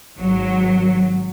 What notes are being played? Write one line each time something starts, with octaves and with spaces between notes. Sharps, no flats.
G#1 F#3